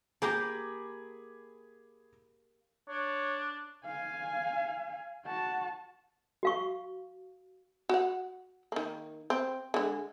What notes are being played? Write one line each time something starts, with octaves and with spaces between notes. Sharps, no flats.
A#3 G4 G#4 A#5 B5 D6
D4 C#5
F5 G#5
F#4 A5
F#4 F5 C#6
F#4 F#5
D#3 A#3
C4
D3 G#3